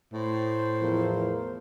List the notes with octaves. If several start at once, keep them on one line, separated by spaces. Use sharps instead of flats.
A2 C5
E2 F3 E4 A#4